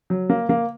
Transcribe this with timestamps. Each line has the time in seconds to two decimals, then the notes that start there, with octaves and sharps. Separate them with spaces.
0.10 F#3
0.30 A#3
0.49 A#3